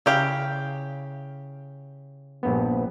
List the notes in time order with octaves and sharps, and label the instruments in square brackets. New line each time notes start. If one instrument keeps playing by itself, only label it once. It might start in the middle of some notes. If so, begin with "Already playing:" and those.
[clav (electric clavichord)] C#3 [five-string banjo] E4 G4 F5
[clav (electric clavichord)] A#1 G2 B3